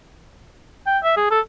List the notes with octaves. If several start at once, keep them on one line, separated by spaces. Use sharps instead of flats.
G5
E5
G#4
A4